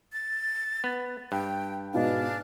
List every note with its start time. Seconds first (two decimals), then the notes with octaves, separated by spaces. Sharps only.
0.13 A6
0.84 B3
1.32 G2 G5
1.94 G#2 B2 D4 D#4 G#4 B4 F5